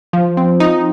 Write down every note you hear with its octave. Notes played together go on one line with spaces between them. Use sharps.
F3
C4
D#4